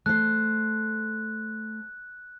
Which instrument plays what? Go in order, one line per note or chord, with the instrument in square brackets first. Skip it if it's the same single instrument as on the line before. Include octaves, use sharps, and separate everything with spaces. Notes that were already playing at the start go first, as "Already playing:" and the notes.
[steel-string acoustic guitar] A3 C5 [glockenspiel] F#6